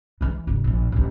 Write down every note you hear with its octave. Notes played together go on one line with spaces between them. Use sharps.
E3 G#3
F1 G2
A#1 A2
A1 D2